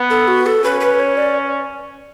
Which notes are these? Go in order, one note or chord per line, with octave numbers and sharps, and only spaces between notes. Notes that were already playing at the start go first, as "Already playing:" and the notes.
Already playing: B3
A4
F#4
A4
C#4 B4
B4
C#5
D5